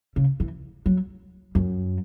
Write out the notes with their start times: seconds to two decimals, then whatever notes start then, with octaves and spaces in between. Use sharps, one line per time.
0.16 C#3
0.40 E3
0.86 F#3
1.55 F#2